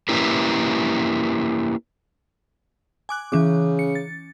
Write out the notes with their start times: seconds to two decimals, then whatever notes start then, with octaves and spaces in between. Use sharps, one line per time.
0.09 A#3 C#4 E4 G4 A#4 B4
3.09 G#5 D6 F#6
3.32 C#3 E3 C#4 D6
3.79 C#7
3.95 A6